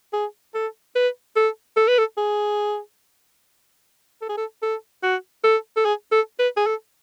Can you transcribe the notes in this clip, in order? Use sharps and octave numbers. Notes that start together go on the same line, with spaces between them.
G#4
A4
B4
A4
A4
B4
A4
G#4
A4
G#4
A4
A4
F#4
A4
A4
G#4
A4
B4
G#4
A4